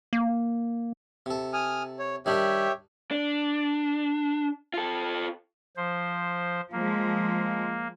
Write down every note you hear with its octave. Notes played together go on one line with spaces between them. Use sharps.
A#3
C3 A4
G#5 D#6 F6
C#5
D#3 G3 D4 G4 C#5 E5
D4
F4 A4
F3 C5
F3 G#3 A#3